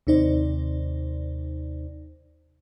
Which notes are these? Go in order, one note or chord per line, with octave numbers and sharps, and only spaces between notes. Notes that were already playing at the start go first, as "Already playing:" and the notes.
D#2 C3 D#4 C5 D5